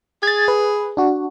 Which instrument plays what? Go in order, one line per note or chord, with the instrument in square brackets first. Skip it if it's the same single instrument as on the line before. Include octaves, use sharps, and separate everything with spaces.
[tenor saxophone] G#4 [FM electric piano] G#6 A6
[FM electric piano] B4
D4 F#4